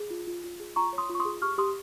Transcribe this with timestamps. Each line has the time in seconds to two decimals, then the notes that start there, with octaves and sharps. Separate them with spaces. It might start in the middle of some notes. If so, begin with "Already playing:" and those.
Already playing: G#4
0.10 F4
0.27 F4
0.44 F4
0.60 G#4
0.76 F4 A#5 C#6
0.93 C#5
0.98 C6 D#6
1.09 F4
1.15 C#6
1.20 C6 D#6
1.25 G#4
1.41 G4 C#6 F6
1.58 G4 C6 D#6